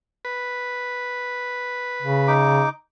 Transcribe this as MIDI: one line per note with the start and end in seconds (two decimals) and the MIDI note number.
0.25 2.34 71
2.02 2.65 49
2.28 2.69 63
2.28 2.69 86